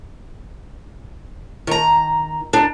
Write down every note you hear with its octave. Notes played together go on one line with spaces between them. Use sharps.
D#3 A#5
D4 D#4